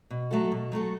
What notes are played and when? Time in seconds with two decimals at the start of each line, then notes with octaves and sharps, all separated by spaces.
0.10 B2
0.31 F#3 A3 F#4 A4
0.52 B2
0.72 F#3 A3 F#4 A4